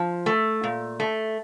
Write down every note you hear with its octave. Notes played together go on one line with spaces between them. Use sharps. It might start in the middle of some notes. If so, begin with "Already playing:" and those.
Already playing: F3
A3
A#2
A3